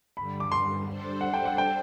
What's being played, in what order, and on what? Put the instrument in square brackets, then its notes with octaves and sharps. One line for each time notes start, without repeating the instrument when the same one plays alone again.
[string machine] G2 D3 G3 [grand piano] B5
[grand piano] D6
C6
[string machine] G3 D4 A4 C5
[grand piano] F#5
G5
F#5
G5